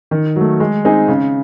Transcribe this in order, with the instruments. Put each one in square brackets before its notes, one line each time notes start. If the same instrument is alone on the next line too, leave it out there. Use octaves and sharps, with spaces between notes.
[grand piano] D#3
F#3 A3
G#3
C4 D#4 G#4
C#3